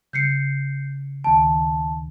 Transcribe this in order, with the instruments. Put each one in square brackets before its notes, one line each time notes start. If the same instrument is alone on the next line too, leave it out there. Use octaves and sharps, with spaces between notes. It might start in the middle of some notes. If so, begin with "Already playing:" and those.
[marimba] C#3 [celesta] G6 C7 C#7
[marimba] D2 D#3 [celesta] A5